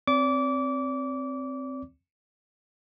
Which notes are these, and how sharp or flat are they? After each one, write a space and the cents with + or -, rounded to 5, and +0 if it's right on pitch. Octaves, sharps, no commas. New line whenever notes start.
C4 +0 D5 -40 D6 -25